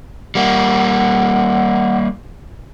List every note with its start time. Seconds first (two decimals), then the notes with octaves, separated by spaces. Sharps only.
0.35 G3 A#3 F#5